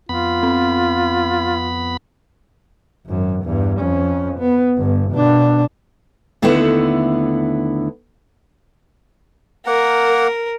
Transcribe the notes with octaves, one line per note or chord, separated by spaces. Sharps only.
F2 B3 F4 B5
C4
G#1 F#2
E2 G2
F2 C#4
B3
G1 G2
B2 D4
D#2 D3 A3 B3 E4 F#5
A#3 A#4 F#5